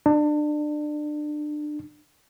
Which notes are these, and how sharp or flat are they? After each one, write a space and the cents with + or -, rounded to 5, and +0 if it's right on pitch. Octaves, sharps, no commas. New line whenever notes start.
D4 +25